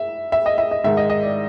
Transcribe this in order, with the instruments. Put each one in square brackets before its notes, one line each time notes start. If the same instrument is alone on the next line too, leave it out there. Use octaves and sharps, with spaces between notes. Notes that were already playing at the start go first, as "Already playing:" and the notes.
Already playing: [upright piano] E5
E5
D#5
E5
D#5
G#2 D#3 G#3 E5
D#5
D#5
D5